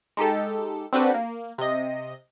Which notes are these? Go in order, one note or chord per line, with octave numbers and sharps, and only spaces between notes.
G#3 D#4 G4 A4
C4 D4 F#4 G4 A4 B4
A#3
C3 D#5